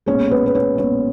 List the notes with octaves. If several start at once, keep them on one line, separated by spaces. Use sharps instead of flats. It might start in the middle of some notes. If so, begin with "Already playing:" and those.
B1 A#2 G#3 C#4 C#5
B3 B4
B4
C#4 C#5
B1 A#2 G#3 C#4 C#5